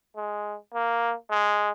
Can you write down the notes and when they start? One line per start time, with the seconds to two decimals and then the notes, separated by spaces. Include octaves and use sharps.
0.16 G#3
0.74 A#3
1.30 G#3